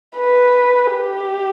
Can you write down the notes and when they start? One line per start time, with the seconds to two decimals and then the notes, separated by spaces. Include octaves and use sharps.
0.17 B4
0.94 G4